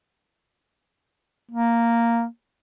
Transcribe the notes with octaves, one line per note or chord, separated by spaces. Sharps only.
A#3